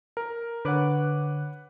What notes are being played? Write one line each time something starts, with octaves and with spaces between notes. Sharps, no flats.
A#4
D3 B4 C#5 F#5 D6 F#6